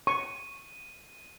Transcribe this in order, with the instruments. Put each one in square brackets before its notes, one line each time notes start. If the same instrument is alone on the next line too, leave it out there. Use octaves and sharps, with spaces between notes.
[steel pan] C#6 [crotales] D#7